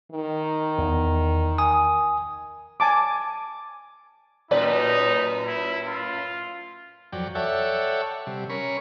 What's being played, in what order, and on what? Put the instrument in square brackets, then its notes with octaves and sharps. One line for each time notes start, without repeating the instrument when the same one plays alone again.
[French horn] D#3
[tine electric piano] E2
G#5 D#6
[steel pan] G#5 A5 D6
[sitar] F#2 A2 B4 [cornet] D#4 [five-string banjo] D5 G5
[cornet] E4
F4
[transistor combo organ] F2 F#3 D5 G5
A4 C#5 D5 E5 F#5 G5
C3 G3
C#4 A#4 B5 C#6